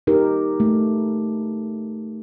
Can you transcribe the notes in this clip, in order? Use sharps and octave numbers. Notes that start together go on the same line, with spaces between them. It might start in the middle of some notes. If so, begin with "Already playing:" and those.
D#4 G4 A#4
A3